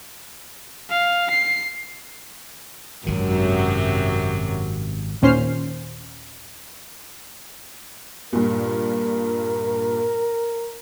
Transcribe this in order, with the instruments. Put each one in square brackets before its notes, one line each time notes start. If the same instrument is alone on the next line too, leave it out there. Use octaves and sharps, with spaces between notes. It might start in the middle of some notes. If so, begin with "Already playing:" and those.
[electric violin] F5
C7
[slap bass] G#1 D#3 [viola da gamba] F#2 C3 F#3
[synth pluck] D#2 A#2 C#4 C5 F6 C7
[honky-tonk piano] G2 A#2 [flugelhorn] A#4